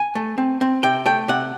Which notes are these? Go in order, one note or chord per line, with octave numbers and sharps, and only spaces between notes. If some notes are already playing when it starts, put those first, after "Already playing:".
Already playing: G#5
A3
C4
C4
C3 G5
A3 G5
C3 F#5